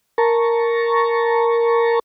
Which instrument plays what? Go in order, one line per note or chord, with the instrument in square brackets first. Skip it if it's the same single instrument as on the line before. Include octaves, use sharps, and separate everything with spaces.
[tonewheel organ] A#4 A5 A#5 C#6